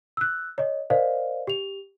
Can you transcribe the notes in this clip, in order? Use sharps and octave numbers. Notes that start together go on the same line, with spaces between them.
E6 F#6
C#5 D#5
A#4 C5 D5 D#5 F5
G4 F7